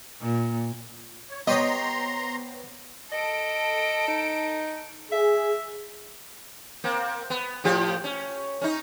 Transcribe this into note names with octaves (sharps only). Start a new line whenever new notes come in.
A#2
C#5
B3 G4 C5 C#5 D#5 A#5 C6
A4 D#5 D7
D#4
G#4 E5
A#3 C4
B3
A2 F3 G4
C#4
C#4 D#4